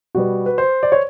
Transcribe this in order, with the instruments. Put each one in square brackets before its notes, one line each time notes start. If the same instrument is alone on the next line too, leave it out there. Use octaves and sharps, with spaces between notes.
[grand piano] B2 G3 B3 F#4
B4
C5
D5
C#5